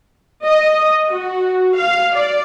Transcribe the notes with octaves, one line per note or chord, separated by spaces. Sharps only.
D#5
F#4
F5
D5